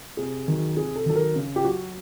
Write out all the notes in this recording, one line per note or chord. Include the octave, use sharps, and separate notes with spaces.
C3 G#4
D#3 F#3
C3 G#4
A4
D#3 F#3 A4
A#4
C#3
G4
F#3 F#4